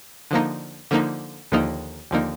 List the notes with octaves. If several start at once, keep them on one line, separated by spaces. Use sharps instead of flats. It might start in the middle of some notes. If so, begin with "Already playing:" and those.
D3 F3 A#3 D#4
D3 F3 A#3 D#4
D#2 D3 F3 A#3 D#4
D#2 D3 F3 A#3 D#4